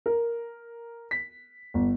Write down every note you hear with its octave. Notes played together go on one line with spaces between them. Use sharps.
A#4
B6
G1